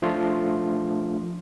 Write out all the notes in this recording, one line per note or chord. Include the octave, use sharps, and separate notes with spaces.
F3 A3 D4 F4